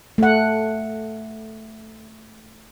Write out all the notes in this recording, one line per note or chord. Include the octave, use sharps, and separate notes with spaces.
A3 F#5